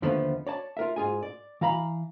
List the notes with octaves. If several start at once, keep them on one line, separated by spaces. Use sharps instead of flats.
D#2 D3 F3 A3 B3 B4
C#5 D5 A5
F4 A#4 E5
G#2 F4 G#4 G#5
D5
E3 F5 A#5 B5